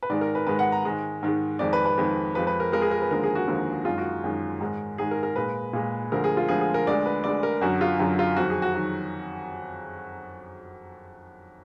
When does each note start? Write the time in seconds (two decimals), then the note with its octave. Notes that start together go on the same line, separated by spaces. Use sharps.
0.03 B4
0.10 G#2 D#3 G#3 D5
0.21 A#4
0.35 B4
0.47 G#2 D#3 G#3 B4
0.59 F#5
0.72 A#5
0.85 G#2 D#3 G#3
1.23 G#2 D#3 G#3
1.59 F2 D#3 G#3 D5
1.73 B4
1.86 B4
1.97 F2 D#3 G#3
2.35 F2 F3 G#3 B4
2.47 B4
2.60 A#4
2.72 F2 F3 G#3 A#4
2.82 G#4
2.91 A#4
3.02 B4
3.11 D#2 D3 F3 G#3 A#4
3.23 G#4
3.35 F#4
3.48 D#2 D3 F3 G#3
3.85 F#2 D#3 G#3 F4
3.98 F#4
4.24 F#2 D#3 G#3
4.60 G#2 D#3 G#3
4.98 G#2 D#3 G#3 G#4
5.11 A#4
5.23 A#4
5.36 A#2 G#3 B4
5.73 A#2 G#3
6.12 D2 D3 F3 G#3 A#4
6.24 G#4
6.37 F4
6.48 D2 D3 F3 G#3 G#4
6.61 G#4
6.74 A#4
6.87 D2 D3 G#3 D5
7.06 B4
7.24 D2 D3 G#3 D5
7.43 A#4
7.61 F#2 D3 F#3 F#4
7.81 F4
7.99 F#2 D3 F#3 F4
8.19 F4
8.37 F2 D#3 F#3 F#4
8.50 G#4
8.62 F#4
8.74 D#3 F#3